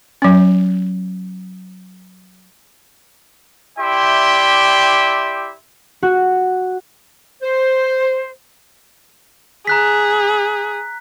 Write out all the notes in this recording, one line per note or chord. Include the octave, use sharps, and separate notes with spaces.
F#3 C#4
E4 G4 D5 E5 G5 C6
F#4
C5
G#4 A#5 F#6 B6